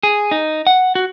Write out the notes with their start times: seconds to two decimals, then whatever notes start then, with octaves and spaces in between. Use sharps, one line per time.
0.03 G#4
0.31 D#4
0.67 F#5
0.95 F#4